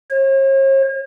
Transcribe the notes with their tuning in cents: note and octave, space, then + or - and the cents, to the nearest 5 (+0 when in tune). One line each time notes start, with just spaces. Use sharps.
C#5 -45